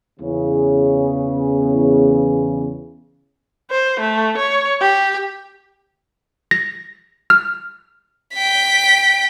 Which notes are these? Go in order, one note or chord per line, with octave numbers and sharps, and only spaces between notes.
E2 C#3
C5
A3
C#5
G4
A#6
F6
G5 B6